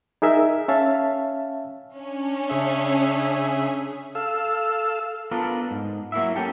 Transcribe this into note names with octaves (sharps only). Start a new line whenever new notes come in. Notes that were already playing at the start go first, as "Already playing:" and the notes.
D#4 G#4 A#4 E5
C#4 C#5 E5 F5 A5
C#4 D4
C#3 G#4 E5
A4 F5 E6
B3 D4 F4 A4 A#4
G#2
F#3 A#3 E4 E5
A#3 C#4 G4 A4